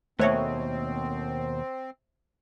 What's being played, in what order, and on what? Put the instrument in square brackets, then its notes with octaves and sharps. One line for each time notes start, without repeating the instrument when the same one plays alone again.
[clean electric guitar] D#2 B2 [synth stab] A3 C#5 [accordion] C4 [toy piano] C5 E5